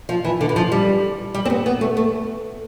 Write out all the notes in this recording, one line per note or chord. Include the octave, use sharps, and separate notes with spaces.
F3
E3
D3
E3
F3
G3
G3
C4
B3
B3
A3
A3